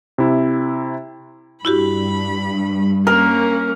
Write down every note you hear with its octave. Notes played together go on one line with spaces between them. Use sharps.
C3 E4
G2 E4 F#4 G4 B5
A#3 C#4 A#4